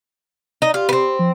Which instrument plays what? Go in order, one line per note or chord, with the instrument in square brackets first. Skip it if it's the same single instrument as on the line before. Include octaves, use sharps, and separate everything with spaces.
[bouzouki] D#4
[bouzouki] F4 [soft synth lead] G4
[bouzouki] B3 C4
[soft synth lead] F3